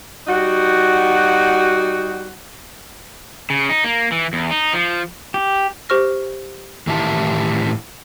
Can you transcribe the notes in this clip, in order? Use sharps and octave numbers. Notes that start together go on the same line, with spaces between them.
G3 D#4 F#4
C#3
D#4
A#3
E3
E2
D#4
F3
G4
G4 C5 C#6 F6 A#6
A2 D#3 E3 E4 G4 A5